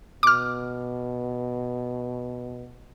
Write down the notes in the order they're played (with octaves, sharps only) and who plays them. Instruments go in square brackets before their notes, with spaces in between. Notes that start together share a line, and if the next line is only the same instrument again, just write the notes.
[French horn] B2 [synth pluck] D6 F6